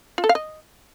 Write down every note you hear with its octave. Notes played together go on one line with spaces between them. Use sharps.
F4
A4
F5
D#5